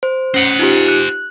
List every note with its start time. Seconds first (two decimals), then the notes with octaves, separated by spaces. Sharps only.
0.03 C5
0.34 C#4 C5 F#5
0.59 D#4 F4 G4
0.88 F#6